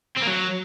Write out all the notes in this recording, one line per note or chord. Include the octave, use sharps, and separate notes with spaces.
C4
A#3
F#3